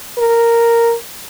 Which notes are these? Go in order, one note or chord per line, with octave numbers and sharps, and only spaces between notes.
A#4